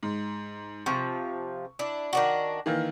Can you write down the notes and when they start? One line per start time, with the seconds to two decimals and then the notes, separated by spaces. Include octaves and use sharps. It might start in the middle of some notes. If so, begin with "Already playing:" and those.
0.03 G#2
0.86 C3 F3 C#6
1.79 D4 E4
2.13 D#3 D4 F#4
2.66 D#3 E3 A#3